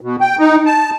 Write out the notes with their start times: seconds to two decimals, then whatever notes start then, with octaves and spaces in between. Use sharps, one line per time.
0.01 B2
0.21 G5
0.39 D#4
0.66 A5